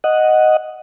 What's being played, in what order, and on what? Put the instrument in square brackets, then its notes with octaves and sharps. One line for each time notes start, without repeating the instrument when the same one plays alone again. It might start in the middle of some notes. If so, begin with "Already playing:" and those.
[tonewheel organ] D#5 F#5